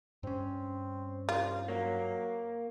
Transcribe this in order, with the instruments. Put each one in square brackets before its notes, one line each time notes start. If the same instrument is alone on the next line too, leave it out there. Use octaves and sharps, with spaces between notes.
[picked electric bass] G2 C#4 [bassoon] C4
[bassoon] C2 [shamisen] F4
[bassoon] F#3 [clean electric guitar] A#3